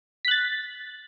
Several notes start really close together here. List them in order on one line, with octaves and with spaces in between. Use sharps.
B6 F#6 A6